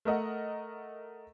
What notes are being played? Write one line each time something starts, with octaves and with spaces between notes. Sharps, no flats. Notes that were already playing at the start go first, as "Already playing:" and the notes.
A3 A#4 D#5 F#5